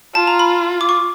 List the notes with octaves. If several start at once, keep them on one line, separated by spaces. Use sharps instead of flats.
F4 A5
A#5
B5
D6
C#6